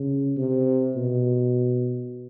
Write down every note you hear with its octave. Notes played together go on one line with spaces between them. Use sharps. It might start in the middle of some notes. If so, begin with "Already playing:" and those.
Already playing: C#3
C3
B2